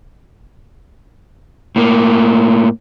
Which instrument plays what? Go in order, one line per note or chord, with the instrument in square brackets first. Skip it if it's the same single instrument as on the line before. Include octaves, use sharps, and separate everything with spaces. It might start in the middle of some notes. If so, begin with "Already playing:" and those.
[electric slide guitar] A2 A#3